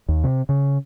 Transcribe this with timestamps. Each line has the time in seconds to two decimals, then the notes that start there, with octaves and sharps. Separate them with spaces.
0.09 D#2
0.24 C3
0.49 C#3